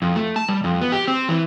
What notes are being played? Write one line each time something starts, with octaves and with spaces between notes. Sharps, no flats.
F2
A3
A5
G3
F2
B3
G4
C4
E3